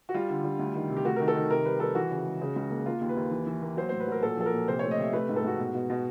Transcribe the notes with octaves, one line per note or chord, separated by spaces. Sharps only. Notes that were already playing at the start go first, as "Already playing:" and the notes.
F#4
G3 F4
D3
G3
D2
D#3
C3
G4
A3 F#4
D#3 A#4
A4
D#3
C3 A#4
G3 B4
G3 A4
E3 F#4
C#3
G#3
C#3
C#2
A#3
A#3 F4
D#2
B4
D#2
E3
E3
A#3
F#3 C5
A2 C5
B4
F#3 A#4
A#2 A4
F3 A4
A#4
A#2
C3 C5
A3 C#5
D#5
C3 E5
A3 B4
G#2
A4
G#2 F#4
B2
B2
B2